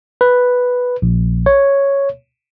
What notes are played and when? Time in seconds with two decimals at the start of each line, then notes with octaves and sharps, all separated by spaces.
0.21 B4
1.02 A#1
1.46 C#5